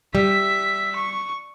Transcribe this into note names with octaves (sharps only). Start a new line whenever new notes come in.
G3 E5 B6
C#6